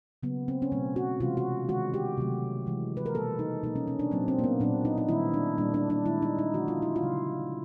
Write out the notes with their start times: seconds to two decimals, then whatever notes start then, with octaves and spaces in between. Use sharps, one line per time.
0.23 C#3 F#3 A#3 B3
0.48 C4
0.62 C#4
0.72 B2 F#3 A3 C4
0.96 F#4
1.20 C3 E3 G#3 F4
1.37 F#4
1.68 D#3 G#3 F#4
1.94 G4
2.17 C3 D#3 F#3 A3
2.66 C3 E3 G#3
2.97 B4
3.06 A#4
3.14 B2 G3 A#3 A4
3.39 D#4
3.63 B2 F#3 A#3 D#4
3.76 C#4
3.88 C#4
3.99 D4
4.11 A#2 F#3 A#3 C4
4.28 C4
4.39 A#3
4.44 B3
4.60 A#2 F#3 A#3 D4
4.85 D#4
4.98 D#4
5.09 D#3 G3 A#3 E4
5.34 D4
5.58 A#2 G3 A#3 D4
5.74 D4
5.90 D4
6.06 D#3 G#3 E4
6.22 D#4
6.39 D#4
6.54 D3 F3 A3 F#4
6.68 F4
6.82 E4
6.96 F4
7.03 C#3 F#3 A#3